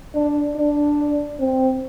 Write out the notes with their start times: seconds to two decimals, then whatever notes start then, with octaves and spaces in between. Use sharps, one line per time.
0.15 D4
0.56 D4
1.40 C4